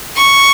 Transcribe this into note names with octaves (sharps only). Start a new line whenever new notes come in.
C#6